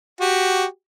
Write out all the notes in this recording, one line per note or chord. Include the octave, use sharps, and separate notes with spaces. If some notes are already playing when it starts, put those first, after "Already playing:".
F#4 G4